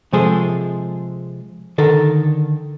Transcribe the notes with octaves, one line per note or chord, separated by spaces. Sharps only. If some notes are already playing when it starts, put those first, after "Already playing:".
C3 F3 G#3 G#4 A4 C5
D3 D#3 A4 A#4